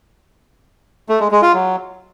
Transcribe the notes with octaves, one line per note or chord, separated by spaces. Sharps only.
A3
G#3
G#3
F4
F#3